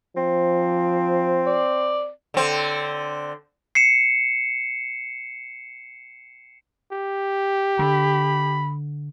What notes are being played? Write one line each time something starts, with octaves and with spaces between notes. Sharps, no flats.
F3 C4
D5
D3 C4
C7 C#7 E7
G4
D3 B5